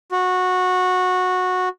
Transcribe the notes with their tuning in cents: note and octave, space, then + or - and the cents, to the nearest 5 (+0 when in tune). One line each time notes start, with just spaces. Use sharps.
F#4 -15